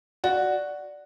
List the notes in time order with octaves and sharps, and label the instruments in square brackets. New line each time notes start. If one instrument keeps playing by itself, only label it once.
[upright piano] F#4 [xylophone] D5